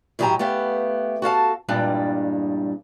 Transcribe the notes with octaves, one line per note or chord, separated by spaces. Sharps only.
A2 D#3 F#3 G4 G#5 A#5
A3 B3 G4 F5
F#4 A4 F5 A5
E2 G2 A#2 G3 G#3 D4